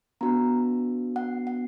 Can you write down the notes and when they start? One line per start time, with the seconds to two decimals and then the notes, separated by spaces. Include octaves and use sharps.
0.21 B3 D4 F#4 A#5
1.16 F#5
1.47 F#5